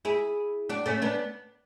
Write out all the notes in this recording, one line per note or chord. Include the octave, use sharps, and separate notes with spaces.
E4 G#4
D4 F#4
A3 C#4
B3 D4